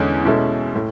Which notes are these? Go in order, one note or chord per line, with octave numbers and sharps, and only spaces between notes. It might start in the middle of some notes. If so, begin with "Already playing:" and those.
Already playing: E2 D3 G#3 C#4
B2 G#3 C#4 E4 A4
A2